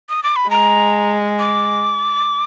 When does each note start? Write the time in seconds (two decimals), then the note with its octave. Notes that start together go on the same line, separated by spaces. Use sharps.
0.09 D#6
0.23 D6
0.36 B5
0.50 G#3 A#5
1.39 D6